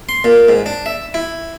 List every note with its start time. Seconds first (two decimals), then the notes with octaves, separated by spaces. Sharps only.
0.09 C6
0.24 A#2
0.49 G#2
0.66 D4
0.86 E5
1.14 E4